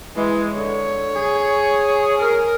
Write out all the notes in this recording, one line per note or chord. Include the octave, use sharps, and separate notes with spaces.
E3 G#3
D3 C#5
G#4
A#4